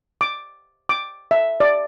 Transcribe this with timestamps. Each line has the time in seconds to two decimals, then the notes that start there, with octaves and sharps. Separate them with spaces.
0.21 D6
0.89 D6
1.31 E5
1.60 D5